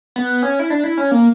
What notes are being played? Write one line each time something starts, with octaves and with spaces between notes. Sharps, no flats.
B3
C#4
E4
D4
E4
C#4
A#3